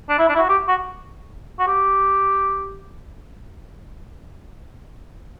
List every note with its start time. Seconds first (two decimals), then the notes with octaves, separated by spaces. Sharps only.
0.09 D4
0.19 E4
0.29 D4
0.35 E4
0.39 F#4
0.49 G4
0.68 F#4
1.59 F#4
1.67 G4